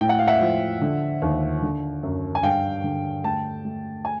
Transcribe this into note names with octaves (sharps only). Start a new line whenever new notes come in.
A2 G5
F#5
F5
E5 F#5
F3
D3
D#2
D3
F#2
G#5
G2 F5 G5
D3
A3 G5 A5
A3
G#5